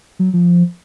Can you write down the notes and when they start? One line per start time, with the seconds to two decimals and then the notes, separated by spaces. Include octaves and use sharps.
0.19 F#3
0.34 F3